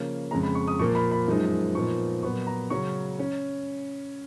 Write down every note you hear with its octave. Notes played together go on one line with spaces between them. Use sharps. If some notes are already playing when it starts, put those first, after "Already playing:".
Already playing: C#3 F3 A#3 C#4
F2 C#3 G#3 A#5
B5
C#6
D#6
A#2 F3 A#3 C#6
B5
B5
F#2 F3 G#3 D#4
A#2 F3 B3 D#4 C#6
A#2 F#3 B3 C#6
A#5
C#3 F#3 C#4 C#6
C#4